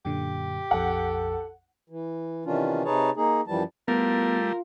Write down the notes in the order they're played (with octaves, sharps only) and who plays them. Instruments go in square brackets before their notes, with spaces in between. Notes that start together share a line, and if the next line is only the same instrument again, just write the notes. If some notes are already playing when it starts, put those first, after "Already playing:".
[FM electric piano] F#2 A#2 D3 [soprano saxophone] G4
[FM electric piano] A#1 F2 [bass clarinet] A4 [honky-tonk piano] F#5
[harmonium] E3
C3 D#3 E3 C#4 D4 F4
C3 D#4 G#4 B4 C#5 A5
A#3 D#4 G#4
F#2 E3 F3 G3 A5
[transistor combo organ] G3 A3 [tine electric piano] B3 [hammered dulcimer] F4 [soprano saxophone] A#4